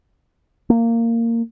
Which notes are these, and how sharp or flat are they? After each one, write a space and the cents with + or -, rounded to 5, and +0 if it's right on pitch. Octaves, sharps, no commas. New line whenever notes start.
A#3 -15